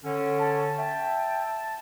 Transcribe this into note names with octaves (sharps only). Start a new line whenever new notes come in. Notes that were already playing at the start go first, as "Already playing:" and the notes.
D3 C#4
A5
E5 G5 A5